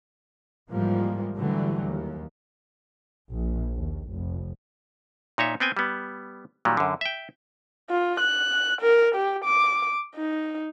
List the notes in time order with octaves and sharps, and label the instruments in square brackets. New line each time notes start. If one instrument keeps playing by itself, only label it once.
[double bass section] G#2 E3 F3 G3 G#3 A#3
G#2 D3 E3 F#3 G3 A3
D#2
A#1
D#2
F1
[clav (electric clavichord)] A#2 D#4 C#5 E5
B3 C4 G5 G#5
G3 B3
A#2 D#3 F#3 G3
F#2 D3
E5 G5
[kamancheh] F4
F#6
A#4
G4
D6
D#4